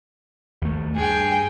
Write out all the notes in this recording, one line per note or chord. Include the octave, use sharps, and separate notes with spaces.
D#2 A3
G2 G#4 G5